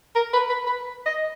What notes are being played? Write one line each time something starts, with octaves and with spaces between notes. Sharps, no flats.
A#4
B4
B4
B4
D#5